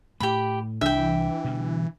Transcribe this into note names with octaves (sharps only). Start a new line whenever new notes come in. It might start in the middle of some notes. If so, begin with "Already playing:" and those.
A2 A3 G4 B5
C2 E3 D4 E5 G5
B2 D3 G3